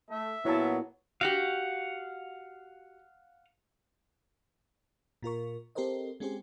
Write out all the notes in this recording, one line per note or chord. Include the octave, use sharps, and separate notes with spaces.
A3 E5
A#2 F#3 B3 E4 A5
F#4 G4 F5 F#5
A#2 F4 A#4 C#6
C4 G4 A4 A#4 C5 D#5
G#3 C4 C#4 G4 G#4 C5